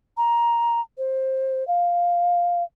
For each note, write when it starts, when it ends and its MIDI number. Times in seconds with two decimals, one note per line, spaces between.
0.17 0.81 82
0.98 1.66 72
1.68 2.63 77